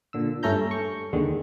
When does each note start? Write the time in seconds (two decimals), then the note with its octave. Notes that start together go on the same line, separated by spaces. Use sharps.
0.13 A#2 D3 E6
0.43 G2 A3 C#4 A4 A#5 G6
0.71 C#6
1.13 D#2 D3 D#3 G#3